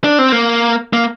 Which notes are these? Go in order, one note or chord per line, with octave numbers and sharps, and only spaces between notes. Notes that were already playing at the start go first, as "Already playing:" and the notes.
D4
C4
A#3
A#3